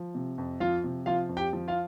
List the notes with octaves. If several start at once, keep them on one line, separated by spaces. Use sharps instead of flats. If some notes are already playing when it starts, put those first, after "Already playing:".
Already playing: F3
C3
F2
F3 F4 F5
C3
F3 F4 F5
F2
G4 G5
F3
F4 F5